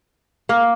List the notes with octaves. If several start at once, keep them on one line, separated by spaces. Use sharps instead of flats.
A#3